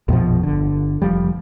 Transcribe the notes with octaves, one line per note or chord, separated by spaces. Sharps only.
A#1 F2 B2 F3
G1 D3
F1 F3 G3